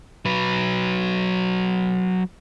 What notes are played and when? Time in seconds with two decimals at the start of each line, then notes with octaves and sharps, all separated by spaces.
0.26 F#3 B4